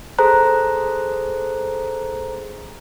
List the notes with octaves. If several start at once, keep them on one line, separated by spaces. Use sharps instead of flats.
G#4 A4 C5 A#5 F#6